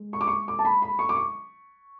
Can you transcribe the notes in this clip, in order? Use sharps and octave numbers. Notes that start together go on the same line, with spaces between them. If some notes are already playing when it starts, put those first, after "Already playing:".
Already playing: G#3
C#6
D6
C#6
D6
A5
B5
B5
C#6
D6
C#6